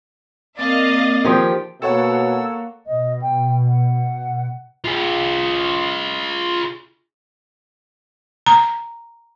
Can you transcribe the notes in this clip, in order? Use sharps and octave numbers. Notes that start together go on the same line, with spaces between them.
A#3 C4 D5 D#5 F5
D#3 F3 G4 G#4
B2 A#3 A4 C#5 F#5 E6
B2 D#5
G5
F#5
F4 G#4
A#5